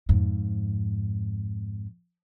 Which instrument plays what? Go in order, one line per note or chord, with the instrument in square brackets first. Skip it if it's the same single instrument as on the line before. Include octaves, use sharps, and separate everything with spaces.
[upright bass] F2 G#2